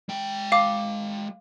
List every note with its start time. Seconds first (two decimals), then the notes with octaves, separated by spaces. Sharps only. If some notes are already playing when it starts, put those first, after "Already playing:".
0.09 G#3 G5
0.52 F5 D6